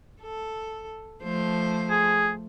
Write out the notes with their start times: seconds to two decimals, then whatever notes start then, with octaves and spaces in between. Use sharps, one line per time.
0.21 A4
1.23 F3 A3 C5
1.90 G#4